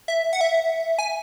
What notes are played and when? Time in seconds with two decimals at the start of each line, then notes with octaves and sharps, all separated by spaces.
0.08 E5
0.33 F#5
0.41 E5
0.99 G#5